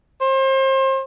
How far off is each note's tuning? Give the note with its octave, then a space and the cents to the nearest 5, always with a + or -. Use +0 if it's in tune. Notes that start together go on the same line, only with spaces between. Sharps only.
C5 +35